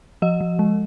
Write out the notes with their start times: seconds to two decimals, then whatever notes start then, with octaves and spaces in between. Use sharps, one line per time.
0.22 F3 D#5
0.41 F3
0.59 G#3